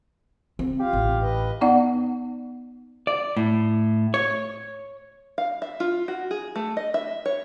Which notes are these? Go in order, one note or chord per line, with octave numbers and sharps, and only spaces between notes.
C4
F4 G4 F5
A1
B4 D#5
B3 D#4 D5 F#5
D5
A2
C#5
F5
E5
F4
F#4
G#4
A3
D#5
E5
C#5